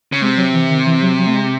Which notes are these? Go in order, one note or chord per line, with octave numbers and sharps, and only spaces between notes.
C#3
C3 G#3
F#3
E3
D#3
E3
F#3
F#3
A3
G#3